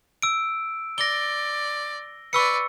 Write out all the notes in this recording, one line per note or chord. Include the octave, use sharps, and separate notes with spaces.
E6 D7
D5 A#6 G7
B4 D5 C#6 E6 C#7